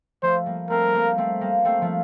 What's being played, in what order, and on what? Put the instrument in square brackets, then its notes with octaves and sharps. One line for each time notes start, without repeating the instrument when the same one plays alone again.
[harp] F3 A3 [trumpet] C5
[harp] G3 A#3
[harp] A3 C4 [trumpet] A#4
[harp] G3 A#3
A3 C4
G3 A#3
A3 C4
F3 A3